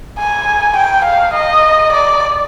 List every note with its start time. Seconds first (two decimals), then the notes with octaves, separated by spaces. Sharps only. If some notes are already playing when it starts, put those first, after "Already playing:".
0.18 G#5
0.76 G5
1.04 F5
1.33 D#5
1.92 D5